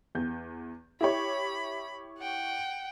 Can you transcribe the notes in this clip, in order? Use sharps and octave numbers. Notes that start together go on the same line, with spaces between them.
E2 G6
E4 G4 C#5 B5
F#5 G5